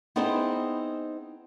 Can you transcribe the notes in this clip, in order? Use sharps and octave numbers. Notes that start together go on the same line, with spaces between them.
B3 C4 D#4 E4 G#4 C5